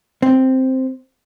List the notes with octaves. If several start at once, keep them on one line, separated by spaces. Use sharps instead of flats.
C4